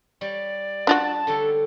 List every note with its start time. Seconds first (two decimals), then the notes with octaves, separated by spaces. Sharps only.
0.21 G3 C#5 D5
0.87 D4 F4 F#4 A5
1.27 D3 G3 A4 C#5